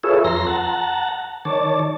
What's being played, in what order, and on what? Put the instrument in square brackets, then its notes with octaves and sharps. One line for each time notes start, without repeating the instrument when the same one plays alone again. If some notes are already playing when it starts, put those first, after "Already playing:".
[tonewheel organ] F4 G#4 A4 B4 C#5 E5
F2 A#5 C6 A#6
F#5 A5 A#5
D#3 C#5 D5 A5